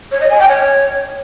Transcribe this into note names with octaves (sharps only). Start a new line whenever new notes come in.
C#5
D#5
G#5
G5
C#5